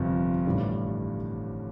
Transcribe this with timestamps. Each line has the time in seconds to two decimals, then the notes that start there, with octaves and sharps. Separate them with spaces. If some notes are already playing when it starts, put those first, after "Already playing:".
Already playing: G1 F2 C3
0.46 A1 G2 D3 G3